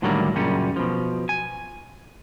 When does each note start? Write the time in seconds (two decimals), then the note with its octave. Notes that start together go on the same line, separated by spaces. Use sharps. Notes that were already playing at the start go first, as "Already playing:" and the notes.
0.02 A2 D3 D#3 F#3 G3 A#3
0.36 F#2 A#2 C#3 G3 C#4
0.76 B2 F3
1.29 G#5